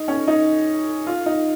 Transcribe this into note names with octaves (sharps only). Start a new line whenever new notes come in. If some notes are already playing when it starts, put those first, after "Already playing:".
Already playing: D#4
C#4
D#4
F4
D#4